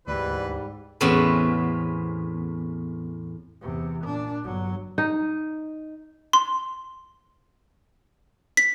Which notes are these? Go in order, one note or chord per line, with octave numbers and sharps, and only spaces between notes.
D2 G#2 E3 G3 B4 D5
E2 A2 C4 C#4 B4
E2 C3
A#2 D4
G1 F#3
D#4
C6
B6